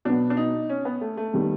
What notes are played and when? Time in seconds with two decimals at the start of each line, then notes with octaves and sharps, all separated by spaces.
0.05 B2 F#3 B3 D4
0.30 D4
0.37 D#4
0.69 C#4
0.85 B3
1.01 A3
1.17 A3
1.33 D#3 G3 B3